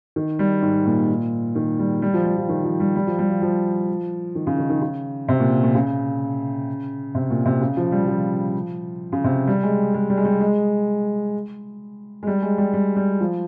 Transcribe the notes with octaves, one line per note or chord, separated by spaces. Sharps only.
D#3
G3
G#2
A#2
D#3
G3
G3
F3
G3
F3
D#3
F3
G3
G3
F3
G3
F3
F3
D#3
C#3
D#3
D#3
C#3
C3
A#2
A#2
C#3
C3
A#2
C3
C#3
F3
G3
F3
C#3
C3
G3
G#3
G#3
G3
G#3
G3
G#3
G#3
G3
G#3
G3
G3
G3
F3